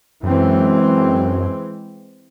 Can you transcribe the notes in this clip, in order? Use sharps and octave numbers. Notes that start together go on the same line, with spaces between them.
F#2 E3 G#3 C4